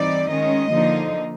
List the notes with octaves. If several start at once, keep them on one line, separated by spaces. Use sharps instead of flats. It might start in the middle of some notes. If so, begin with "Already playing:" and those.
Already playing: E3 G3 C4 D#4 D5
D#3 G#3 C#4 D#5
D3 F3 A#3 D#4